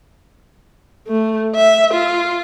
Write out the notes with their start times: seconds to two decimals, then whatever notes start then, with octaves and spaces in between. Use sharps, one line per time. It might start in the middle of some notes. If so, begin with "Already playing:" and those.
1.07 A3
1.56 E5
1.94 F4